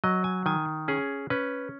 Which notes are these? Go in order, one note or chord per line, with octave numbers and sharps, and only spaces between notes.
F#3 D#5
G#5
D#3 G#5
C#4 G#4
C#4 B4